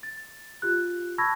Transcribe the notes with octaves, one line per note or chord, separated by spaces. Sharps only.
A6
F4 G4 F#6
A5 B5 C#6 E6 G#6 A#6